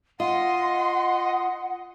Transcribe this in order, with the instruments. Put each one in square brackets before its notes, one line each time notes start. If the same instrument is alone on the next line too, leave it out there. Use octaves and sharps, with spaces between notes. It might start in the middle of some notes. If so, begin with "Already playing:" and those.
[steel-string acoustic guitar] F4 [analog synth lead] D#5 [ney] F#5 [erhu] C6